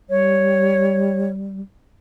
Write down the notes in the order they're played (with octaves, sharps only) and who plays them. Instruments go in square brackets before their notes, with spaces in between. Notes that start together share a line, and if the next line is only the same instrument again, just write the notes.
[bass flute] G3 [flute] C#5